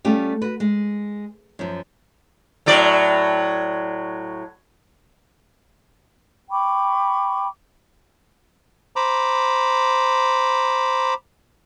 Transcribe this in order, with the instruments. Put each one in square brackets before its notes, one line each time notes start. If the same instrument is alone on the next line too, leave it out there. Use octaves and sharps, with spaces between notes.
[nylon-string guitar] G3 A3 C#4 F4 G4
F#4 B4
G#3
F#2 F3
[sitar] A2 F#3 D5
[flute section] G5 B5 C#6 D6
[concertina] C5 A#5 B5 D6